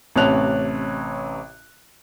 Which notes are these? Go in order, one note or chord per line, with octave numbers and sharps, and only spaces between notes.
A1 C3 C#4 A5 F#6 F7